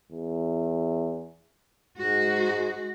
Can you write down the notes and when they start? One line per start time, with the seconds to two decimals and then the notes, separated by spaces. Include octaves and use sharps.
0.11 E2
1.98 G#2 G#3 F#4